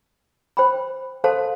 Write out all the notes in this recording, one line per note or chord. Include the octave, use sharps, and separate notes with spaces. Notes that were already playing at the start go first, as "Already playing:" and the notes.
C5 G5 B5
A4 C5 F5 A5 C6